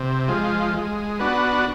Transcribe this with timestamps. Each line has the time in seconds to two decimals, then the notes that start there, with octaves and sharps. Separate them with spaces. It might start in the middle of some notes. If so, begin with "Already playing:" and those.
Already playing: C3
0.28 F3 G#3
0.74 G#3
1.19 B3 D4 F#4